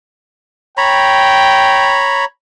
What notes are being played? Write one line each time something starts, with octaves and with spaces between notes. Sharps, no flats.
C#5 G5 A#5 B5